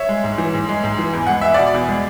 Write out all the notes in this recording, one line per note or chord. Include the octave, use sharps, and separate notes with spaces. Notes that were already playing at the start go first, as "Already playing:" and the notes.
Already playing: C#5 E5
G#3
G#2
E3
G#2
G#3
G#2
E3
E2
G#3 F#5
E2 E5
B2 D5 F#5
E2
G#3